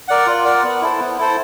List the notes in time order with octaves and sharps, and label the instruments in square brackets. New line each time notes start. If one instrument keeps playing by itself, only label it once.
[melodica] A#4 D5 F#5
F4
A#4 D5 F#5
B3
E4 A4 C5
B3
E4 A4 C5